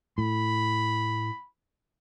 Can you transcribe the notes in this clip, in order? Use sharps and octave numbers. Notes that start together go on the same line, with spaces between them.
A2 B5